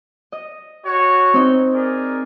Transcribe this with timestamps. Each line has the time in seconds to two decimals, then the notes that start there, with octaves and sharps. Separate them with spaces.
0.32 D#5
0.85 F#4 C#5
1.34 C4 D#4
1.74 G#4 A#4 D5